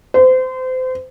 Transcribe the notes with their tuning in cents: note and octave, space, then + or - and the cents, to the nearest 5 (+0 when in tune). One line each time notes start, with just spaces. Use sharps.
C5 -30